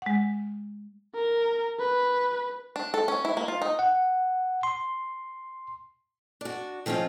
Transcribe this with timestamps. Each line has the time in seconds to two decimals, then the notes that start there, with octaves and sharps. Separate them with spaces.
0.02 G#3 F#5
1.15 A#4
1.79 B4
2.76 D4
2.94 A4
3.08 C#4
3.25 E4
3.37 A#3
3.48 F4
3.62 D#4
3.79 F#5
4.63 C6
6.41 D4 F#4
6.86 D#3 F3 C4 C#4 F4